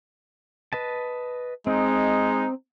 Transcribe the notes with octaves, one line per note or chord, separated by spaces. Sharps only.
B4 D#5 A5
G#3 C4 D#4